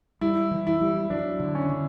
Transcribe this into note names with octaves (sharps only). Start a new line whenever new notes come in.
G3 E4
E3
E4
G3
F#3 D4
D3
C#4
D3